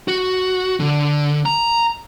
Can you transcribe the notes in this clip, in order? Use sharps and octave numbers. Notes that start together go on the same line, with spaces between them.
F#4
D3
A#5